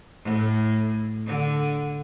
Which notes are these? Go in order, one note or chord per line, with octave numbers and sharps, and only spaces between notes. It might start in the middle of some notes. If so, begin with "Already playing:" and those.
A2
D3